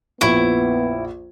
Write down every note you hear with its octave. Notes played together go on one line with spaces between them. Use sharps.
A#1 F2 B3 E4 C#6